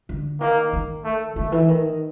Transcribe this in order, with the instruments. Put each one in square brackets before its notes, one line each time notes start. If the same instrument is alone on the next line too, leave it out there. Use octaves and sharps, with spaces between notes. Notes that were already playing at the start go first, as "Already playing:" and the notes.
[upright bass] D3
[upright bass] D#3 [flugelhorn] A#3
[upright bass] D#3
[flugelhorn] A3
[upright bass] D#3 [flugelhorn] A3
[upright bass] E3
D#3